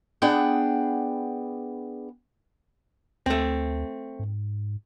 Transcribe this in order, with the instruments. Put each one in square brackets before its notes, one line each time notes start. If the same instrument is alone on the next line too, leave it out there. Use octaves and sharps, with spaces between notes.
[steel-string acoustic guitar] B3 D4 G#4 F#5 G5
[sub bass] D2 [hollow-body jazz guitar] A3 C4
[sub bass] G#2